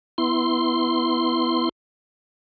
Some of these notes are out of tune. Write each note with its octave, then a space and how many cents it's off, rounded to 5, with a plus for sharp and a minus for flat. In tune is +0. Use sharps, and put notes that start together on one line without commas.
B3 +0 E4 +0 C6 +0